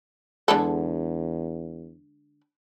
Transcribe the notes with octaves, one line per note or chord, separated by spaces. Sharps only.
E2 D3 G#3 A4